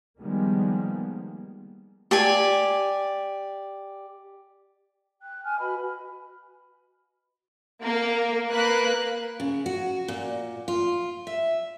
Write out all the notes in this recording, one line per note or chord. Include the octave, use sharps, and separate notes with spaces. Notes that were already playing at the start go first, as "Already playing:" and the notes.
D#3 F3 G3 G#3 A#3 B3
G4 D5 G#5
G5 F#6
G#5 F6
F#4 B4 D#5 B5
A#3
A#3 B4 F#6
C#3
F#4
A#2
F4
E5